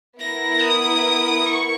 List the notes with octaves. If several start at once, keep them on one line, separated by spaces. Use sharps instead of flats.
B3 E4 A#4 A#6
D#6
C#6